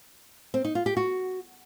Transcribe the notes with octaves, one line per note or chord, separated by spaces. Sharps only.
C4
D#4
F4
G4
F#4